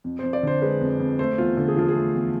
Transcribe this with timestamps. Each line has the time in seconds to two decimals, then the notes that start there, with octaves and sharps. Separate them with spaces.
0.04 F2
0.19 F2 C5
0.33 D5
0.43 D3 C5
0.62 G#3 B4
0.81 F2
1.00 F2
1.19 A3 C5
1.38 E2 F4
1.57 D3 A4
1.68 G#4
1.76 F3 F4
1.88 G#4
1.95 A3
2.14 E2